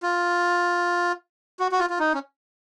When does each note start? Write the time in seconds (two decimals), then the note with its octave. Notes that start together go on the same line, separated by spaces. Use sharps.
0.03 F4
1.60 F#4
1.72 F#4
1.79 F4
1.90 F4
1.99 D#4
2.14 C#4